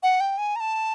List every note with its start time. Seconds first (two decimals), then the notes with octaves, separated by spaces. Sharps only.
0.03 F#5
0.20 G5
0.38 G#5
0.56 A#5
0.60 A5